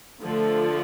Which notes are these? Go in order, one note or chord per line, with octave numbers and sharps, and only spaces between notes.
D3 F3 A3